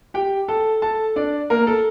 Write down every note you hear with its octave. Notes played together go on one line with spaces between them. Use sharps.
G4 G5
A4 A5
A4 A5
D4 D5
A#3 A#4
A4